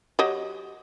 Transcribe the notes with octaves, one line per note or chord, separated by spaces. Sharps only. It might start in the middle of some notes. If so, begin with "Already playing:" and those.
F#3 G4 D#5